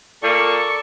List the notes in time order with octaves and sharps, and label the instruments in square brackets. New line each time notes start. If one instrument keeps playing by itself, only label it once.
[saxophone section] A#2 A#3 [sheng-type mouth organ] A4 D5 [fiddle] C#6